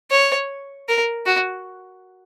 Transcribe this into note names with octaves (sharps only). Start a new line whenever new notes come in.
C#5
A#4
F#4